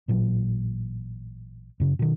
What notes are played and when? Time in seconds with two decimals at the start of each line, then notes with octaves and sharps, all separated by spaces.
0.08 A1 A#2 F#3
1.80 F#2 C#3
1.99 B2 D#3